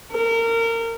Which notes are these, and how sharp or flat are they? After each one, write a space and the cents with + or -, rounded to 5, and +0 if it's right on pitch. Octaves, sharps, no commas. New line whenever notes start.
A#4 -25